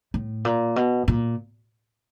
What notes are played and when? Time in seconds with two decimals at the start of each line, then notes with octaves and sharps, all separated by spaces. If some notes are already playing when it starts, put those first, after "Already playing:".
0.14 A2
0.45 A#2
0.76 B2
1.08 A#2